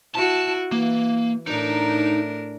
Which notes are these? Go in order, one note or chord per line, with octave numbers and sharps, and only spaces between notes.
E4 F#4 A5
E3 A#3
A2 D4 D#4 A#4